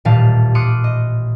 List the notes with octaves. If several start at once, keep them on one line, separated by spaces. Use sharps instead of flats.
D#1 A1 A#2 G3 F5 A5
C6 D6 D#6 F6 F#6 C#7
D#5